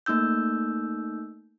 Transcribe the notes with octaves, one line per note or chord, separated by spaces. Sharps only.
A3 A#3 D#4 E6 G6